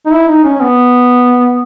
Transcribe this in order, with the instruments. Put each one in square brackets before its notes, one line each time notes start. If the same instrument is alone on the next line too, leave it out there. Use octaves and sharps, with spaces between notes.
[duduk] D#4
E4
D#4
C#4
C#4
B3